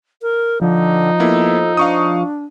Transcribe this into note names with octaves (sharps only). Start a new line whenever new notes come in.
A#4
D3 F3 D#4
A#3 B3 E4 A4
D4 F5 C#6 D#6